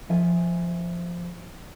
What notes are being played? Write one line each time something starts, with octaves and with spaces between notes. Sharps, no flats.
F3 E5 G#5